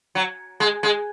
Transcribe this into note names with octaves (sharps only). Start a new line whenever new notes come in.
F#3
G#3
G#3